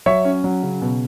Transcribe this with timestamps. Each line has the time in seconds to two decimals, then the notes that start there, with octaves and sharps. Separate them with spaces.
0.06 F#3 C#5 E5
0.25 C#4
0.44 F#3
0.63 C#3
0.82 B2